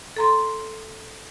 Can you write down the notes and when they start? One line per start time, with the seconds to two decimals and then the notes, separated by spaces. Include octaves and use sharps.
0.16 A4 A#5 C6